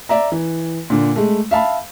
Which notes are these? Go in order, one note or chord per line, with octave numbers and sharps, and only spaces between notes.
D5 E5 A#5
E3
A#2 D3
G#3 A3
E5 F5 A5 B5